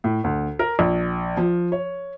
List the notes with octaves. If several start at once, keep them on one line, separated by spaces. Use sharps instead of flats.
A2
D2
A#4
A#1
F3
C#5